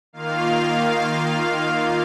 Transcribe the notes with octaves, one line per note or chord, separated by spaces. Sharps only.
D#3 A#3 F4 F5